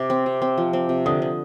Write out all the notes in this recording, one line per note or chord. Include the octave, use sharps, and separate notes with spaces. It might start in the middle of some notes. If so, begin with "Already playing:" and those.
Already playing: C3 D6
C4
C3
C4
F3
C4
C3
D3 D#6
D3